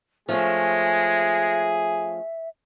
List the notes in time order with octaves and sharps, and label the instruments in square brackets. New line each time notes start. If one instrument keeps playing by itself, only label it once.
[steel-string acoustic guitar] F3 A3 C#4 [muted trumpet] G#3 [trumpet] G#4 [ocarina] E5